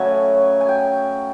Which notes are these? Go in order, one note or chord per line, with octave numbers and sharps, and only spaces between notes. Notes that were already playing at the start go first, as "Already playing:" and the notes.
Already playing: C#3 F#3 A3 G#5
G#5
G5